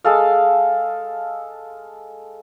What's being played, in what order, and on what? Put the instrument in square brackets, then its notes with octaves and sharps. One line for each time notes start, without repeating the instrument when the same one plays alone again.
[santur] G#3 A4 F5